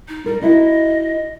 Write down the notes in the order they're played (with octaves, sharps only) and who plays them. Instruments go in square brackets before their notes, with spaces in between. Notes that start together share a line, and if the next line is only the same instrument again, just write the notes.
[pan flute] D#4
[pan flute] G3 [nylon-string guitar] A#4
[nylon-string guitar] D#4 E4 F#4 [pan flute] D#5